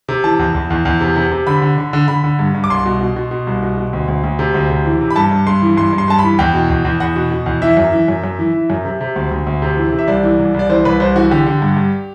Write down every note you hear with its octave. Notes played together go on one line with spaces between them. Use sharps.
C3
E3 A5
E2
E2
E2
E2
C3
C3
C3
D3 B5
D3
D3
D3
D3 B5
D3
G2
G2
D6
C2 C6
B2
B2
B2
B2
C2
B2
B2
D2
D2
D2
C3
D2
C3
E3
C3
B5
G2 A5
G2
G2 C6
E3
G2 C6
G2
C6
G2 A5
E3 B5
E2 G5
B2
E2
E2
E2 F#5
B2
B2
E2
E3 E5
F#2
E3
F#2
F#2
E3
E3
F#2
C3
C3
D2
D2
D2
C3
E3
C3
E5
C2 D5
E3
C2
C2 D5
E3 C5
C2 B4
C2 C5
E3 F#4
D3 G4
D3
G2
G2